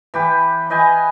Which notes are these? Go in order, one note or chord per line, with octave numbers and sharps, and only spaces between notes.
E3 G4 B4
B4 D#5 G5 G#5